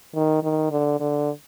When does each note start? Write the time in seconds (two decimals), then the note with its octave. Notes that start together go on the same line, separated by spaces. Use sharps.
0.15 D#3
0.43 D#3
0.71 D3
1.00 D3